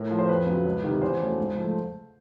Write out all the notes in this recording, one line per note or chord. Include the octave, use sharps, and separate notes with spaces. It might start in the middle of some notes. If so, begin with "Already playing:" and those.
Already playing: A2 A#4
F3 A3
C5
F2 B4
C#3 F#3
C#2
C3 D#3 G3
E2 C5
C#3 F#3 A3
G#2
F3 A3